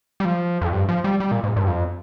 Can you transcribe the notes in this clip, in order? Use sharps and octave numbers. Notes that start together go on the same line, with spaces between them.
G3
F3
F2
G2
F3
G3
G3
A#2
G#2
G2
F2